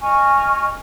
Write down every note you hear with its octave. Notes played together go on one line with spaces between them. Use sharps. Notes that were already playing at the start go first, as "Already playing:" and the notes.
D#5 G#5 C#6 F6